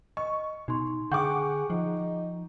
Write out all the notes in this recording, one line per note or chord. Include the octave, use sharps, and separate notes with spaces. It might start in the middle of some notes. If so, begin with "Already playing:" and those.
D#5 C#6
B2 D#4 C6
D3 G#4 F#5 G5 C#6 D6 G6
F3 D#4